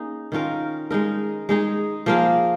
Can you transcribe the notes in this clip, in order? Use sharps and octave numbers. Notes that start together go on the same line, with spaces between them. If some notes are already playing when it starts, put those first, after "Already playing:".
Already playing: A#3 C#4 D#4 G#4
D#3 C#4 F4 A#4
G#3 D#4 A#4
G#3 D#4 G#4
F3 A#3 F4 G#4